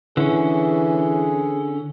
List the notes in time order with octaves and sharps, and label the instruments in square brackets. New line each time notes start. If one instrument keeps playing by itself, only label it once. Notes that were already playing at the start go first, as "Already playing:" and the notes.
[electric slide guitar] D3 C#4 [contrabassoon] E3 [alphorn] G#4